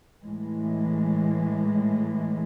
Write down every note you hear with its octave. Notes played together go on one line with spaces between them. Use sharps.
A2 E3 G#3